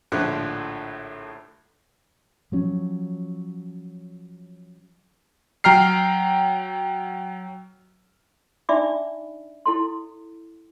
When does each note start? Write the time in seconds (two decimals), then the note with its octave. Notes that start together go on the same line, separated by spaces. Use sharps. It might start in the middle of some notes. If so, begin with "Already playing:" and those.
0.12 A#1 A2 D3 F3 E5 F#6
2.52 F3 F#3 C#4
5.64 F#3 G5 A#5 F6 C7
8.69 D4 D#4 D5 E5 B5 D6
9.66 E4 A4 C6